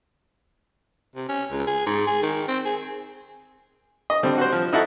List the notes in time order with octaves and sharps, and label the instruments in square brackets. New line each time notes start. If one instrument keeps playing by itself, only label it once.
[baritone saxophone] C3
C#4
C#2
G#4
G#2
G#4
D#3
C4
G#4
[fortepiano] D#5
D3 G3 C4
F#4 C5
F3
D#4 E4 F#4 A4